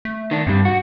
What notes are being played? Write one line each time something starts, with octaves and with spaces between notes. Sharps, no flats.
A3
D#3 D4
G2 C3 G3
F#4